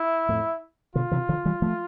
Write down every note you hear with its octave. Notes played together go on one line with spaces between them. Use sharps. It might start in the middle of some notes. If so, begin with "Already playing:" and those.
Already playing: E4
F2 A2
B2 D3 F4
C3 E3
D3 F3
E3 G3
F3 A3